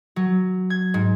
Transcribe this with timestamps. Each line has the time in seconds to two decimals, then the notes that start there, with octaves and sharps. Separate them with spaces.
0.16 F#3
0.70 G#6
0.94 G#2